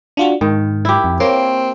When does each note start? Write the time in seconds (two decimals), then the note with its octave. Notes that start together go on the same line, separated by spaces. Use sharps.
0.17 D4 F4 F#4
0.41 G#2 D#3
0.85 E4 G4
1.04 F2
1.20 A#3 C4 C#5